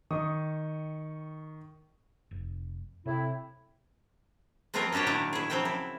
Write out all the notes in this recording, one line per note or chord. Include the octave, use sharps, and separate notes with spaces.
D#3 C#6 D#6
F1
A2 C3 C4 E4
F3 F#3 B3 C4 F4 A#4
C#4 D4 F#4 G4 C#5
A#2 D#3 F#3 D4 E4 A#5
E4 G#4
C#3 F3 F#3 C4 F#4 G5
E4